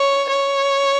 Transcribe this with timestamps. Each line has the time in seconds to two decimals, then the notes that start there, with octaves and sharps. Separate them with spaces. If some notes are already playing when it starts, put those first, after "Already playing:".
Already playing: C#5
0.29 C#5